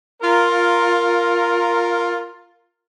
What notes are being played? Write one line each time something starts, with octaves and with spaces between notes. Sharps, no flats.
F4 A#4